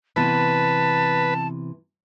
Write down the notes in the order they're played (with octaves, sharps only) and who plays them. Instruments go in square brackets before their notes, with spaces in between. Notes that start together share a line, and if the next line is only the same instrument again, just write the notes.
[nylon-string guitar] C3 E3 B3 [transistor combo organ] B4 [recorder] A5